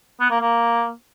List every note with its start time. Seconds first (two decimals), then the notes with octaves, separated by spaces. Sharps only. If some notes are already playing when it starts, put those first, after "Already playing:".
0.20 B3
0.30 A#3
0.41 A#3